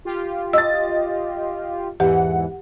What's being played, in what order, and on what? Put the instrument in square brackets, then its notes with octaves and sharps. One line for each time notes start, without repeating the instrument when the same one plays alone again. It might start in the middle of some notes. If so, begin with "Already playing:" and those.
[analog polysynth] F4 G4
[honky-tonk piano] D#5 A6 [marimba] E6
[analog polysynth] E2 G#2 E3 [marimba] G4 [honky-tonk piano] F#5